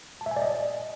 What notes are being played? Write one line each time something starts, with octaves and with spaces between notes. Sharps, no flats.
A5
E5
G#5
D5
D#5